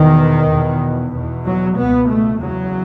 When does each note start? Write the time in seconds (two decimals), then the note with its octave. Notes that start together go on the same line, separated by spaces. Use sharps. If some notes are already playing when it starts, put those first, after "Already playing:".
Already playing: E2 B2 D#3
0.48 E2 B2
1.12 E2 B2
1.44 F#3
1.76 C#2 B2 B3
2.09 A3
2.40 E2 C#3 F#3